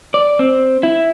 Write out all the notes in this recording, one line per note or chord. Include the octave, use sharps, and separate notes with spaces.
D5
C4
E4